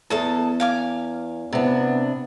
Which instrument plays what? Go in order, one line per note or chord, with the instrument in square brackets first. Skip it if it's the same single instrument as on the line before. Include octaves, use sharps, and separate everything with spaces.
[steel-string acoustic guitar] E2 [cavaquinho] G#4 A4 A5
[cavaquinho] F5 G#5 D6
[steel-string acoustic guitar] C3 D4 [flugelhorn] B3